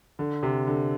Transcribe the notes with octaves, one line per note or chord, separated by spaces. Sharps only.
D3
C3
D3